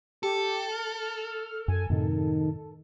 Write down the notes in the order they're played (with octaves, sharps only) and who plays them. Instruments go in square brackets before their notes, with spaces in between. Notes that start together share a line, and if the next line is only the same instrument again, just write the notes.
[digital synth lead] G4 [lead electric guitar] A4
[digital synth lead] F6
[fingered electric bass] F#2 [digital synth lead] G#5
[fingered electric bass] F#2 A2 C3 [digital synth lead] D#3